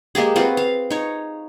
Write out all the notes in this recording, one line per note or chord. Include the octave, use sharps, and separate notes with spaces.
G#3 A#3 G4 G#4
C4 F4 F#4 B4
F5
D#4 C#5